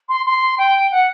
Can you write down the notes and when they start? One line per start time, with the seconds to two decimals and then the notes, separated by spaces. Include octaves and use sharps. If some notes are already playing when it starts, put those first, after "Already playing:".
0.09 C6
0.26 C6
0.58 G5
0.91 F#5